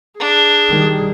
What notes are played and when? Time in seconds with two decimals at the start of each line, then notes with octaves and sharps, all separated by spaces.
0.20 D4 G#4
0.69 D#3 G3